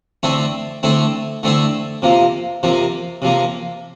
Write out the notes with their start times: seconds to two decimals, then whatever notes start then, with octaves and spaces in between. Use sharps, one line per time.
0.23 D3 A3 C4 E4
0.83 D3 A3 C4 E4
1.43 D3 A3 C4 E4
2.02 C3 F3 A#3
2.63 C3 F3 A#3
3.22 C3 F3 A#3